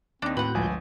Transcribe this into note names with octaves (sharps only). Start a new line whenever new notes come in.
D#2 C4 D4 D#4
A2 F#4 B4 F#5 G6
G1 C#2 F3 G#5